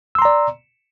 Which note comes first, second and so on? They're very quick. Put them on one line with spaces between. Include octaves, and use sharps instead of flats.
E6 C6 A#5 D5